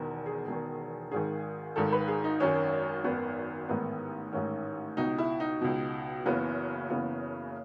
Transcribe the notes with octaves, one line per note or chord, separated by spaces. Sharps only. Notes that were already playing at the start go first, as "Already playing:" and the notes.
Already playing: E1 E2 D#3
G#4
E1 E2 D#3
G#1 G#2 D#3 G#4
G#1 G#2 D#3 A4
B4
G#4
D#4
G#1 F#2 D#3 C#4
G#1 F#2 D#3 B3
A1 G#2 D#3 B3
A1 G#2 D#3 C#4
C#2 B2 D#4
E4
D#4
C#2 B2
F#1 F#2 C#3 E3 B3
F#1 F#2 C#3 E3 B3